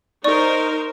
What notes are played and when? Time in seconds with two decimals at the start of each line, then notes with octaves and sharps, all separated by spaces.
0.24 D#4 A#4 C5 D5 C#6